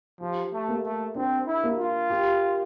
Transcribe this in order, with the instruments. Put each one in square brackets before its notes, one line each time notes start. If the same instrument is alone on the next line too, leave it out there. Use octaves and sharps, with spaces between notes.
[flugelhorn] F3 [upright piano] G4
[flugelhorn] A3
[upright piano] A#3
[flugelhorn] A3
[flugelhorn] C4 [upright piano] D4
[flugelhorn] E4
[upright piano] A#3
[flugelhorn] F4
[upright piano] G4